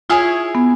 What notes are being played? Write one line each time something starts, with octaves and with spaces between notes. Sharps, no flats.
E4 F4 G#4 C#5
B3